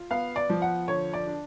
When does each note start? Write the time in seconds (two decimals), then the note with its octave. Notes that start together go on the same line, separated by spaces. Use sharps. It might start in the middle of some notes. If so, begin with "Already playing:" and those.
Already playing: F4
0.10 B3 F5
0.36 D5
0.50 F3
0.62 F#5
0.88 D3 C#5
1.13 D5
1.27 D4